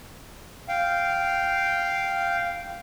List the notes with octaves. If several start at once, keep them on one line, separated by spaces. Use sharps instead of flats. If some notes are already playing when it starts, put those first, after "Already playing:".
F5 G5